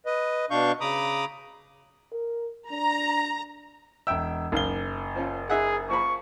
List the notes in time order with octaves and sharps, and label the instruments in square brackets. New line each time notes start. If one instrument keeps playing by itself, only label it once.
[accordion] B4 D#5
B2 D4 F5 C#6 G6
C#3 A#5 B5 D6 D#6
[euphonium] A#4
[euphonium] D4 [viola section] A#5
[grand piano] E1 E6 [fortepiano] E5 G5
[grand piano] F#1 G7 [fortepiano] D#3 F5
[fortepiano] F3 C#4 F4
[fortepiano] D#4 E5 F#5 [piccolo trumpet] G#4
[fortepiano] F3 A#3 B5 [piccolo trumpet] C#6